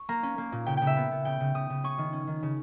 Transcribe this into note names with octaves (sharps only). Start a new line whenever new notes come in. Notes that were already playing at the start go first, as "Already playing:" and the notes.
Already playing: C#6
A#3 A#5
C#4
A#3
A#2
C#3 G5
C#3 G5
E5
B3
B3
C#3 G5
C#3
C#3 D#6
C#3
C#4 C#6
D#3
C#4
D#3
C#3